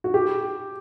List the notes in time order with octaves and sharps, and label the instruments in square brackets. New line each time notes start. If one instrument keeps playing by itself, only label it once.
[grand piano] F#4
G4